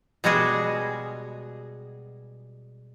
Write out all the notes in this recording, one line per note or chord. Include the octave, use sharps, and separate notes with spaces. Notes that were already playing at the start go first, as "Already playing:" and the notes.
B2 G3 G#3 B3 F#4 G#4